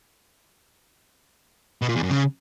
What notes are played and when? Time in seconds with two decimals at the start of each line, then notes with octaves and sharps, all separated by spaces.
1.82 B2
1.89 A#2
1.96 E2
2.03 F#2
2.10 C#3